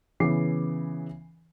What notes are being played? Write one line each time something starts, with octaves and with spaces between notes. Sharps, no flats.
C#3 E3 B3 D6 C7